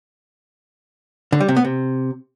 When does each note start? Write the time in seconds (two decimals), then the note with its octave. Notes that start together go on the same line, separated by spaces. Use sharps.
1.32 D3
1.40 G3
1.48 C3
1.57 B3
1.65 C3